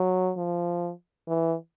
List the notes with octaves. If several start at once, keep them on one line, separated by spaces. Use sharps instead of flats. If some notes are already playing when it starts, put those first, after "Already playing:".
Already playing: F#3
F3
E3